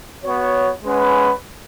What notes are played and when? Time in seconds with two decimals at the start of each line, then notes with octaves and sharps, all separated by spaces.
0.24 B3 F#4 C#5
0.83 G#3 C#4 B4 F#5